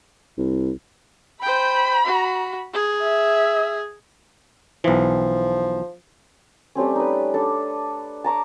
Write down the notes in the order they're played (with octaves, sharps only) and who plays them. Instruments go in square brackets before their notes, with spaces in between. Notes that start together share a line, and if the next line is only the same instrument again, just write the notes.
[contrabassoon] C2
[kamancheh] C5 G5 [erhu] B5
[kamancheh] F#4
G#4
[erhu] E5
[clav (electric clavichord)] B1 E3 [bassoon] F3
[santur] G3 A3 C4 C#4
D#4 B4
D4 A4
A5 A#5 C#6 D6